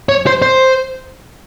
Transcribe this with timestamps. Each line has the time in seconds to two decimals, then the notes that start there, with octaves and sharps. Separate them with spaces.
0.09 C#5
0.27 C5
0.42 C5